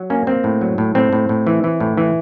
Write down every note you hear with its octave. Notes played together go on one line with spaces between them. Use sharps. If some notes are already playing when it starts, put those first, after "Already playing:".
Already playing: F#3
A#3 C#4
A#3 C4
A2
F#3
A2
A2 C4
A2
A2
E3
E3
A2
E3